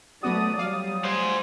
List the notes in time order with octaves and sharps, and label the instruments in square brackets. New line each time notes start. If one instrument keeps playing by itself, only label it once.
[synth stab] F#3 B3 F#4 [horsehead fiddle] A3 D5 [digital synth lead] D#6
[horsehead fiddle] F#3 G3 [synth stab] D5 F5
[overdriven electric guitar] C5 G#5